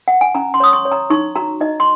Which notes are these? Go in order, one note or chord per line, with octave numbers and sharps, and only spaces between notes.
F#5
G#5
C#4 A#5
C6
C#5 D#6
C#6
C#5
A#5
D#4 C#6
F#4 A#5
D#4 D#5
C6